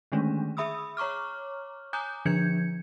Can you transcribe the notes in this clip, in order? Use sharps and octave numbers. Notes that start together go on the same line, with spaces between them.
D3 D#3 G#3 A3 C#4 D4
G#4 E5 B5 D#6 E6
C#5 A#5 C#6 D6 F6
G#5 A#5 D6 D#6 F#6 G6
D3 F3 D4 G6 G#6 C#7